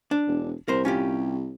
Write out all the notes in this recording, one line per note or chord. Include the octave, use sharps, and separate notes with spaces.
D4
E1
C2 A#4 C5
C#4 F4 G4